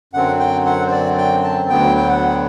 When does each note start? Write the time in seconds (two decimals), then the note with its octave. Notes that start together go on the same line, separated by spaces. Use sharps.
0.13 F#2 D3 F#3 C4 F#5
0.39 G5
0.66 F#5
0.87 C5
0.91 D5
1.18 G5
1.44 A5
1.69 D2 D3 F#3 B3 G5
1.97 G5
2.08 F#5